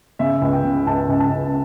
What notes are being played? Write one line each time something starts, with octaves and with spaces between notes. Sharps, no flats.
C#3 E5
C#2
G5
C#3
C#2 A5
C#2
A5
C#2